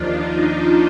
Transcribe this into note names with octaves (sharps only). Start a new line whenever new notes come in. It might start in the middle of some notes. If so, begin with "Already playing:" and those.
Already playing: D#2 D#3 F3 D4 F4
D#4